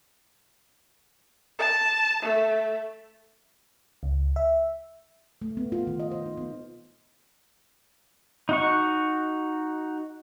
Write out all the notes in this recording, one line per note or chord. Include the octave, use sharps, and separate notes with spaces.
A5
A3
C#2
E5
A3
B3
F4
D#3
D#5
C5
D#4
B3
D#4 F#4 C#6